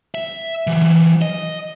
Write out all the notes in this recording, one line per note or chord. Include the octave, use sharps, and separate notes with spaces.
E5
E3 F#3
D#5